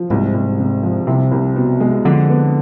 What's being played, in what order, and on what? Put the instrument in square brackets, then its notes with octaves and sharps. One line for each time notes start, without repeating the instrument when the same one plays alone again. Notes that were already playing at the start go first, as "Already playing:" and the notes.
Already playing: [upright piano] F3
[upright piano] C2 [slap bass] G#2
[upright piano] C2
C3
F3
[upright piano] C2 [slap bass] C3
[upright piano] C2
B2
G#3
[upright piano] F2 [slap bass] D3
[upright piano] B3